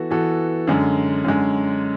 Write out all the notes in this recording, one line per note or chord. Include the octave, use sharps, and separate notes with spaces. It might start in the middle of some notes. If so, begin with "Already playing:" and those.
Already playing: E3 B3 F#4 A4
E3 B3 F#4 A4
F#2 D3 G#3
F#2 D3 G#3